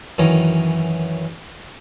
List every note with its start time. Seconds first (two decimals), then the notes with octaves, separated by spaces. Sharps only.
0.18 F#2 D#3 E3 C#4 A#5